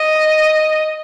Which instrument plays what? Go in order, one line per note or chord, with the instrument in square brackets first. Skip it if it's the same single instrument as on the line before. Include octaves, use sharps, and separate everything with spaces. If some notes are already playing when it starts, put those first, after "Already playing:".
Already playing: [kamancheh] D#5